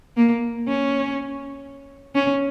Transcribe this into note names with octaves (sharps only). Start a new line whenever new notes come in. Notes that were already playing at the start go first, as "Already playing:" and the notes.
A#3
C#4
C#4